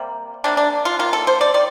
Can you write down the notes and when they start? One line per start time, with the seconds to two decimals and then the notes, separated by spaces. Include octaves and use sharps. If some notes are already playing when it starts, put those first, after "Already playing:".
Already playing: C3 G3 A#3
0.44 C3 G3 A#3 D4
0.57 D4
0.85 F4
0.99 D#3 A#3 F4
1.13 A4
1.27 C5
1.41 D5
1.54 D#3 D5